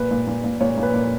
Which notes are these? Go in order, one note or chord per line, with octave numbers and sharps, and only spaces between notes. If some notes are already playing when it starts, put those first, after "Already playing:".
Already playing: A#2 B4
A#2
A#2
A#2
A#2 C#5
A#2
B4
A#2